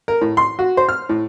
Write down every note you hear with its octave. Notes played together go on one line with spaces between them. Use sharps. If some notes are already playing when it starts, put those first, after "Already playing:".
A#4
A2
C6
F#4
C5
F6
A2